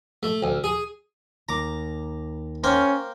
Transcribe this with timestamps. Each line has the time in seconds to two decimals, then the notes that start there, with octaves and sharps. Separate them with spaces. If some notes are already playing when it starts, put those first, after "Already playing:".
0.23 A3
0.42 D2
0.64 G#4
1.49 D#2 A#5 D6
2.64 A#3 C#4 C5 G5